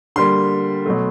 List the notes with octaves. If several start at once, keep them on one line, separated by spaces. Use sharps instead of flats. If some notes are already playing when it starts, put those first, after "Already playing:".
D3 G3 A#3 C6
B2 F#3 A3